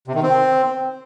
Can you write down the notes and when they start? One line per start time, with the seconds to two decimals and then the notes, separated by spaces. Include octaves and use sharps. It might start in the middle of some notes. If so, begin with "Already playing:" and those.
0.08 C3
0.15 D#3
0.23 C4